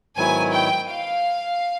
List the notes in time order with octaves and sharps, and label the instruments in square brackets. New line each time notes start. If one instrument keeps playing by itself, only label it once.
[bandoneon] G#2 D#3 F#3 B3 E4 [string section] G#5
[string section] G5
F5